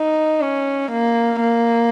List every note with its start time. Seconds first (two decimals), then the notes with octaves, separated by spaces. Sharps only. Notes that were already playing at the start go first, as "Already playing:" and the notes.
Already playing: D#4
0.42 C#4
0.92 A#3
1.42 A#3